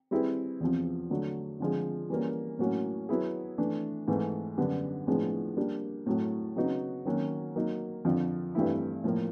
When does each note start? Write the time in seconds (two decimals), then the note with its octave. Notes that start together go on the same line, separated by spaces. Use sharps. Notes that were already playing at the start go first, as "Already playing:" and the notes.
0.11 G3 C4 E4 G#4 B4
0.60 E2 C3 F3
1.10 D3 F#3 A3
1.60 D3 F3 G#3
2.10 E3 G3 A#3 C#4
2.59 A2 F#3 A#3 C#4 F#4
3.09 F#3 B3 E4 G#4
3.58 E3 A3 D4
4.08 G#2 E3 A3
4.58 F#2 D3 G3 B3 D4
5.07 A2 F3 G#3 B3 D4
5.57 G3 A#3 D4
6.06 A2 F#3 A3
6.56 C#3 F#3 B3 D#4 F#4
7.05 D#3 F#3 A#3 C#4 F#4
7.56 F#3 A#3 D#4
8.05 F2 D3 F3
8.55 G2 E3 A3 C4 E4
9.04 A2 F3 A#3